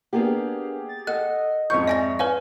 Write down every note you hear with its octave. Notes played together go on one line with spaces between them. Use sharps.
A#3 B3 D4 G4 G#4
A6
A4 D#5 F#5 F#6
F2 G#2 F4 C#5 C#6 G6
D5 E5 G#5 A#6
B4 C#5 F5 G#5